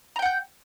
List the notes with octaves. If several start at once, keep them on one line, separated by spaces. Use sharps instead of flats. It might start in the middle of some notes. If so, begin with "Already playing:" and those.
F#5 G5 A#5 G6